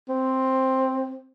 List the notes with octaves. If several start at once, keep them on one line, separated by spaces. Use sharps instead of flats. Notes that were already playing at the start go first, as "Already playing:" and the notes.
C4